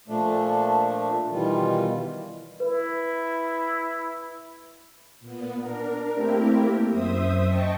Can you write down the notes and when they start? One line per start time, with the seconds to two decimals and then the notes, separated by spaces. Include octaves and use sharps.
0.08 A#2 F3 A3 D4
1.32 B2 D#3 E3 G3 F4
2.60 E4 B4
5.20 A#2 B3
5.58 D4 A#4
6.13 A3 A#3 C4 E4 G4 A#4
6.89 F#2 C5 E5 D#6
7.45 D#5 G5 A5 C#6